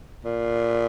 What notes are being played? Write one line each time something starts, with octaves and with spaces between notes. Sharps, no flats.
A#2